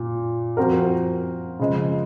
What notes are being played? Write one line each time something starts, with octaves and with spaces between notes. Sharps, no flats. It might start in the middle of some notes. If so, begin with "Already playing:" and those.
Already playing: A#2
F3 C4 F#4 A#4
C#3 F3 G#3